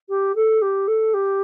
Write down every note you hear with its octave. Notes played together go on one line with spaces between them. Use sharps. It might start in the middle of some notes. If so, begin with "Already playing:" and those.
G4
A4
G4
A4
G4